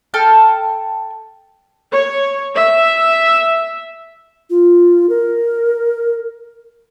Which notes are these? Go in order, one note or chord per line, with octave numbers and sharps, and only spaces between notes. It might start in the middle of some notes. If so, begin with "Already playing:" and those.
A4 G5 F6
C#5
E5
F4
A#4